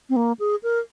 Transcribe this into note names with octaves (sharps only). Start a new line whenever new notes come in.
C4
A#3
G#4
A#4